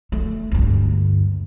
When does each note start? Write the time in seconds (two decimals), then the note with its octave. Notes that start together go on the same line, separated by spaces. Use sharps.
0.12 A3
0.52 D2 G2